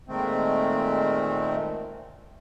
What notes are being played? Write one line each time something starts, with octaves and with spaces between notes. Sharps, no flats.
A#2 D#3 G#3 A3 C4